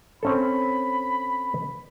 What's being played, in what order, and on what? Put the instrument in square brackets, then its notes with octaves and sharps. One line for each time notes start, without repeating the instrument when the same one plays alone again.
[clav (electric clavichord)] C4 C#4 A4 [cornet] B5